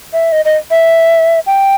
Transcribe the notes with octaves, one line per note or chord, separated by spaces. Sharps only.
E5
D#5
D#5
E5
G5